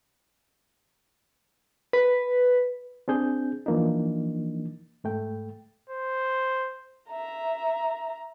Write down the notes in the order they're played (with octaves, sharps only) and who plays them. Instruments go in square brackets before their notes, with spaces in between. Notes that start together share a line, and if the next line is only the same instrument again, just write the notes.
[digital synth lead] B4
[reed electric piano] C4 D4 G#4 G6
E3 F3 A#3 D4 D#4
G#2 A3 G5
[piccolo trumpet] C5
[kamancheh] E5 A#5